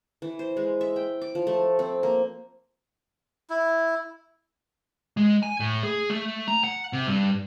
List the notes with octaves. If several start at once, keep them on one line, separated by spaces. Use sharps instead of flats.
E3
C5
G#3
E5
G5
D6
F3
A3
C4
A#3
E4
G#3
G#5
A2
G#4
A3
A#5
F#5
C3
G2